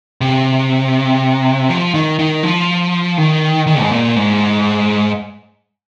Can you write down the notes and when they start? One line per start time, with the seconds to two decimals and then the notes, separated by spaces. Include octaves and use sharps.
0.21 C3
1.69 F3
1.94 D#3
2.19 D#3
2.43 F3
3.18 D#3
3.67 D#3
3.80 G#2
3.91 A#2
4.16 G#2